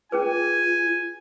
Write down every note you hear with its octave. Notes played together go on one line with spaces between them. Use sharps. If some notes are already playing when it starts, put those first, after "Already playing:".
C#4 F4 G#4 B4 G#5